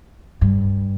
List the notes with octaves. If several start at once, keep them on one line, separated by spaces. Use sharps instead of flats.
G2